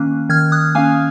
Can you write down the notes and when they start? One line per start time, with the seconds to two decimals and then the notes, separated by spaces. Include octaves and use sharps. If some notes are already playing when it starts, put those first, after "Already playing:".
Already playing: D#3 A#3 C#4 F#6
0.29 D#3 F6 G#6
0.52 D#6 F#6
0.75 A#3 C#4 F5 G#5